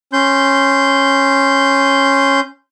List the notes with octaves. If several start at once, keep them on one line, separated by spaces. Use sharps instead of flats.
C#4 C6 G6